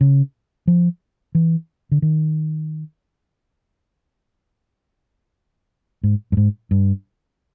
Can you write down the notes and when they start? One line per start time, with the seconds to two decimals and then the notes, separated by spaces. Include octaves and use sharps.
0.01 C#3
0.67 F3
1.35 E3
1.92 D3
2.02 D#3
6.03 G#2
6.32 G2
6.37 G#2
6.71 G2